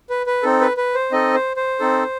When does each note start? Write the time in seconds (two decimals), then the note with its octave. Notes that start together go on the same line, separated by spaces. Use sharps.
0.10 B4
0.26 B4
0.43 C4 D#4 A4
0.61 B4
0.77 B4
0.94 C5
1.12 C4 D#4 A4 D#5
1.34 C5
1.57 C5
1.80 C4 D#4 A4